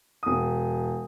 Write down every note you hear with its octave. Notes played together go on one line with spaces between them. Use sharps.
E1 D#6